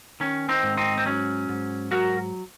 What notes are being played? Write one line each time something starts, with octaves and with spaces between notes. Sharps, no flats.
D#3 C#4
C4 D#4
G#2
C4 D#4
C4
F#3 C#4
G#2
F#3 F#4 A#4